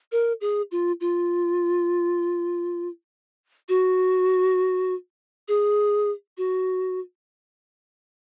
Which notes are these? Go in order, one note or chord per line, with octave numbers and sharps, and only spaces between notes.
A#4
G#4
F4
F4
F#4
G#4
F#4